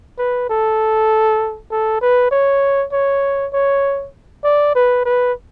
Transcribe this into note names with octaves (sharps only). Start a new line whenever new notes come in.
B4
A4
A4
B4
C#5
C#5
C#5
D5
B4
B4